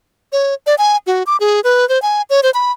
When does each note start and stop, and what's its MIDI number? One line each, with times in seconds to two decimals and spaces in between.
0.32 0.54 73
0.66 0.75 74
0.78 0.97 80
1.07 1.23 66
1.27 1.37 86
1.40 1.61 68
1.64 1.88 71
1.89 2.01 72
2.02 2.22 80
2.30 2.41 73
2.43 2.50 72
2.54 2.72 83